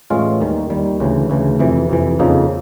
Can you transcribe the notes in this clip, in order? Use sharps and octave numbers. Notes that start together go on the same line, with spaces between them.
A2 E3 G#3 C#4 F4
D#2 D#3 G3
D#2 D#3 G3
D2 C#3 E3
D2 C#3 E3
F2 C3 E3
F2 C3 E3
F2 C#3 F3 A#3 D#4